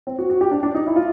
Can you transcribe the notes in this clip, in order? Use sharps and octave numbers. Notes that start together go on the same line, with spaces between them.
C4
F#4
F#4
G4
D4
D4
D#4
E4
F4